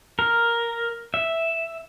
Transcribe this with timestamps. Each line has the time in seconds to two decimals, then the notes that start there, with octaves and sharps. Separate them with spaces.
0.19 A#4
1.14 E5